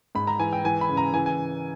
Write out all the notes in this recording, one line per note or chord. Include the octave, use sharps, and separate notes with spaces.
G#2 B5
A#5
E3 G#5
G5
E3 G#5
B5
C#3
A#5
E3 G#5
G#5